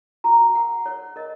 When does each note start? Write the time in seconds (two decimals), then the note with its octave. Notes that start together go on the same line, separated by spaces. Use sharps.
0.24 F#4 A#5
0.55 A#4 F#5
0.85 A#4 C#5
1.16 A#4 D#5